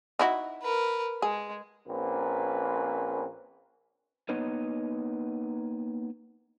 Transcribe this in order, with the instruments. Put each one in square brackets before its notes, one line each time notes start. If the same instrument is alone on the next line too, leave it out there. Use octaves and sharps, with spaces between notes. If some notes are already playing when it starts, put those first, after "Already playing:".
[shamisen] D#4 E4 F#4
[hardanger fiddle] A#4 B4
[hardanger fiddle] G#3 [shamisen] G#4
[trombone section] A#1 A#3 C4 C#4 B4
[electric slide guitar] A#3 B3 D#4 B4 C#5 D#5